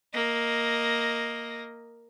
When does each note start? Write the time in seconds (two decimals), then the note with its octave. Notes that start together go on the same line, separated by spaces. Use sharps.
0.13 A#3 D#5